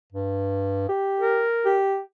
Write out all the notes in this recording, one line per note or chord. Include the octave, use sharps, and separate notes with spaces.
G2
G4
A#4
G4